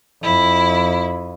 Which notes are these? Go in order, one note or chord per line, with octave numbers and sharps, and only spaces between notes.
F2 E4